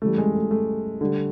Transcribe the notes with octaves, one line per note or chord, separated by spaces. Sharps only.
C#3 E3 G3 A3
G#3
A3
A3
D3 G3